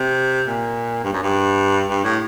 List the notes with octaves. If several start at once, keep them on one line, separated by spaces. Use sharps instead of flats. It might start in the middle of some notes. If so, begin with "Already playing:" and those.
Already playing: C3
A#2
G2
F#2
G2
G2
A2